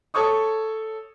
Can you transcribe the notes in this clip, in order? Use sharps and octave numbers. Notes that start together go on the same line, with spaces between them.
A4 C#5 C#6 D#6